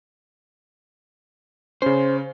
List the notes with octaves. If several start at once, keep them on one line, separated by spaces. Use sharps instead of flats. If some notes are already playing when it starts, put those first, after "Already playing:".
C#3 C#4 C5